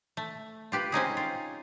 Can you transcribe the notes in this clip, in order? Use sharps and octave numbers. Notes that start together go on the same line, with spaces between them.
A3
F4 G4 B4
C4 C#4 D#4 G#4
F4